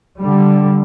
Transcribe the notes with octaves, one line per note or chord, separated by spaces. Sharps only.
D3 G3